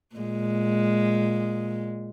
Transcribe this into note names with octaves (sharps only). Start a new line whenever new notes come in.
A#2 G#3